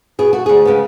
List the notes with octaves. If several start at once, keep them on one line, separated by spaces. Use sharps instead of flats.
B2 G#4
A3 F#4
D2 G#4
C#3 G#3 B3